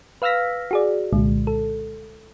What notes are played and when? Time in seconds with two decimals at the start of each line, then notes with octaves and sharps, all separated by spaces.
0.22 B4 F5 E6 F6 A#6 B6
0.71 F#4 G#4 D5
1.13 C2 A#2 D3 G#3
1.47 A4